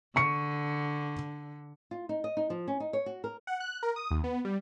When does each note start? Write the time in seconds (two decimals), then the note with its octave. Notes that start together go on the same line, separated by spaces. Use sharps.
0.16 D3 C#6 C#7
1.91 F4
2.09 D#4
2.24 D#5
2.37 D#4
2.50 F3
2.68 C#4
2.80 D#4
2.93 C#5
3.06 F#4
3.24 A#4
3.47 F#5
3.60 F#6
3.83 A#4
3.96 D#6
4.11 D#2
4.24 B3
4.45 G3